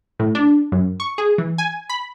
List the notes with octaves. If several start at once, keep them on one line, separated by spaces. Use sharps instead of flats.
A2
D4
F#2
C#6
G#4
E3
G#5
B5